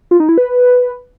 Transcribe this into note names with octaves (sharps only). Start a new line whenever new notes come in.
F4
D#4
E4
B4